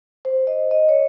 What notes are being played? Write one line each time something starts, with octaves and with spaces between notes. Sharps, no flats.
C5
D#5
D#5
C#5